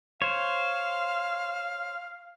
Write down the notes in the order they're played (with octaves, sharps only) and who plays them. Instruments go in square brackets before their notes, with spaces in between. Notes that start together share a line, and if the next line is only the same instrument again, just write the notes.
[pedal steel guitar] C5 C#5 [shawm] F5